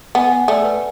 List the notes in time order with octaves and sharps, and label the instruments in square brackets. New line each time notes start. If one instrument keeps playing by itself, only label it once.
[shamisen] B3 [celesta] G#5
[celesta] F#5
[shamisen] A3 [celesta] D5
[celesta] B4